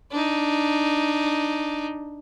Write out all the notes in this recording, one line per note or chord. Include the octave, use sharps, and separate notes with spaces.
D4 D#4